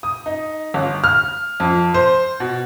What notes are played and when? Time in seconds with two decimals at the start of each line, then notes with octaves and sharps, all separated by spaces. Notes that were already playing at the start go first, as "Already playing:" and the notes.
0.03 D#6
0.26 D#4
0.74 G1
1.04 F6
1.60 F2
1.94 C5
2.40 B2